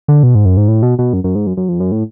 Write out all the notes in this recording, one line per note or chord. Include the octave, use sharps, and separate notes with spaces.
D3
B2
G#2
F#2
G#2
A2
B2
B2
F#2
F#2
G#2
F#2
F#2
F2
F#2
A2